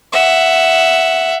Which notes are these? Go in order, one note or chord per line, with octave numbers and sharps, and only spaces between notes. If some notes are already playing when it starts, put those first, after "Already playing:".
E5 F#5